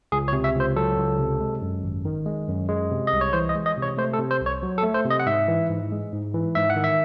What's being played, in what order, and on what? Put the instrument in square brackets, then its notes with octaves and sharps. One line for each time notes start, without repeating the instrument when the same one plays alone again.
[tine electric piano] C#2 G#4
C#5
C3
E5
C#2
C5
F#3 A4
C#2
C3
G#3
F#2
G#1
D#3
G#3
F#2
G#3
C3
D#5
C2
C#5
E3 C5
D#5
G#3
D#5
C3
C#5
A3 C5
A4
C3
C5
C2
C#5
F#3
A4
A3
C5
C3
D#5
F#5
G#2 E5
E3
G#2
G#3
G#2
E3
G#2 E5
F#5
D#3
E5